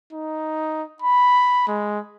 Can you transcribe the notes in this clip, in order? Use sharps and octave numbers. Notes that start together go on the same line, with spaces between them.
D#4
B5
G#3